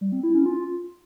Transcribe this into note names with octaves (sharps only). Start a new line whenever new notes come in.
G3
C4
E4
C#4
F4